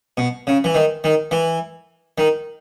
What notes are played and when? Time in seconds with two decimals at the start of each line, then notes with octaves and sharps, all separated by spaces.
0.17 B2
0.47 C#3
0.64 E3
0.75 D#3
1.04 D#3
1.31 E3
2.18 D#3